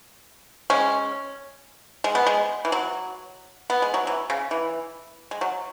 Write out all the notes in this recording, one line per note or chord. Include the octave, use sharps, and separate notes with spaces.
G#3 C#4
G#3
B3
G#3
E3
F#3
B3
G#3
F#3
E3
C#3
E3
G#3
F#3